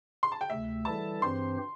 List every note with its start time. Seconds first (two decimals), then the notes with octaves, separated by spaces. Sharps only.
0.23 C6
0.32 A5
0.41 G5
0.50 D2 C3 A3 E5
0.85 E3 G3 E4 A4 A5
1.21 G2 E3 C4 G4 C5 C6